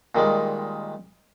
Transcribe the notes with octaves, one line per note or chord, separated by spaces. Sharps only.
A#2 D#3 G3 G#3